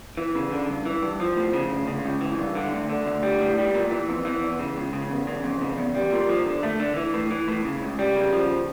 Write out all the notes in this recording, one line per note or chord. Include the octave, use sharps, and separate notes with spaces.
E3
C#3
D3
G2
E3
G2
F3
A2
C#3
D2
C#3
C#2
E3
G2
D3
D2
D3
D2
G3
A2
G3
A#2
E3
F2
E3
E2
C#3
C#2
C#3
E2
C#3
F2
C#3
E2
G3
A#2
F3
D3
A3
D3
E3
A2
E3
A2
C#3
C#2
G3
C#3
F3